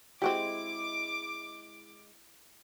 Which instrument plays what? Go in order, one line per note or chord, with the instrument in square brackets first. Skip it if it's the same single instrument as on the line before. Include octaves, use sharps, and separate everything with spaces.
[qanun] G#3 E4 [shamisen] C4 F#4 G4 [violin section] D6